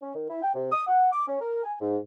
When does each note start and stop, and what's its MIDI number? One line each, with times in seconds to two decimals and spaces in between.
0.02 0.15 61
0.15 0.26 51
0.29 0.39 64
0.42 0.51 79
0.54 0.70 48
0.72 0.83 87
0.87 1.11 78
1.12 1.26 86
1.27 1.36 61
1.41 1.63 70
1.64 1.74 80
1.80 1.97 44